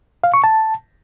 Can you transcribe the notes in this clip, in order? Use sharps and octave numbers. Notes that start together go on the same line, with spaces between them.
F5
C#6
A5